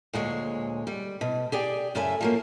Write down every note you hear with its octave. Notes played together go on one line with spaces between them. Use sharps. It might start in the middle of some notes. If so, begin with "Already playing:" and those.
D2 A#2 G#3 C#5
G3
B2
G4 G#4 D5 G5
F#2 C#3 A4 E5 G#5
F3 F#3 A#3